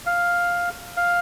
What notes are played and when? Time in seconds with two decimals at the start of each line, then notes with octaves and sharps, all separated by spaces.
0.06 F5
0.97 F5